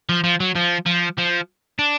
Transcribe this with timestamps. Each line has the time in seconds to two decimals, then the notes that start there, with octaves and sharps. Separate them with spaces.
0.09 F3
0.24 F3
0.40 F#3
0.56 F3
0.86 F3
1.18 F3
1.79 D4